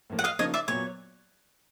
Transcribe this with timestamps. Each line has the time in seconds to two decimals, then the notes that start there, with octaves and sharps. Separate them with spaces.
0.10 A2 F3 A#3
0.19 F#5
0.24 D#5 F5
0.39 C#3 F3 A#3 D#4 C#5 D#5
0.54 D5 E5
0.68 A#2 F#3 B3 C#5